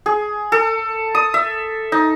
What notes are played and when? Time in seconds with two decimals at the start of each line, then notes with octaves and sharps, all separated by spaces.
0.06 G#4
0.52 A4
1.15 D#6
1.34 E5
1.92 D#4